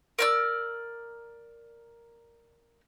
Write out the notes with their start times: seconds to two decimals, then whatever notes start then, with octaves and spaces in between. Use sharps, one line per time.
0.19 A#4 D5 E6